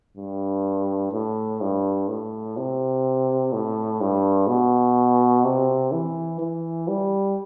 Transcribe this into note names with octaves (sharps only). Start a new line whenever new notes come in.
G2
A2
G2
A2
C3
A2
G2
B2
C3
E3
E3
G3